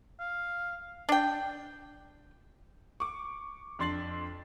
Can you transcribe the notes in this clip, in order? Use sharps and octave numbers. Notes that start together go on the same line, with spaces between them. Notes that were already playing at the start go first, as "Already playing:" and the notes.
F5
D4 G5
C#6 D6
F2 D4 C6 A6 C7 F#7